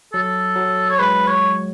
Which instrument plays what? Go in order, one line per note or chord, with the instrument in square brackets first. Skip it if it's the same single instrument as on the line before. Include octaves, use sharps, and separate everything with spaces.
[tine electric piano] F#3 [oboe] A4
[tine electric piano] F#3
[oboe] C#5
[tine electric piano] G#3 [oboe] B4
[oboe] C#5